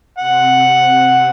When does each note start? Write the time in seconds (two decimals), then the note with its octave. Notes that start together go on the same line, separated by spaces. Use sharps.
0.18 C3 C4 F#5
0.69 C3 C4